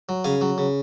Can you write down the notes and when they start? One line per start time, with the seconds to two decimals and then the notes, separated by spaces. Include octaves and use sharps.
0.09 F#3
0.24 C#3 F5 G#5
0.41 F#3
0.58 C#3